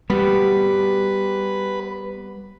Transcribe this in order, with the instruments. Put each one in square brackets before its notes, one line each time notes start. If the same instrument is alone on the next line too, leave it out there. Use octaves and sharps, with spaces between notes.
[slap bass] G3 [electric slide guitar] B3 F#4 G4 [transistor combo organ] B4